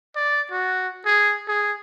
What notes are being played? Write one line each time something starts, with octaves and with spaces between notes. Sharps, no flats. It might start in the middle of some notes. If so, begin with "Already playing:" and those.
D5
F#4
G#4
G#4